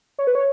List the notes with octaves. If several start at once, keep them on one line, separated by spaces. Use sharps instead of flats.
C#5
B4
C#5